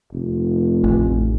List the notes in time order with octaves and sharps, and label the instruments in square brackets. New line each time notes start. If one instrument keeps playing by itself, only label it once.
[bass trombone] F1
[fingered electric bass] A1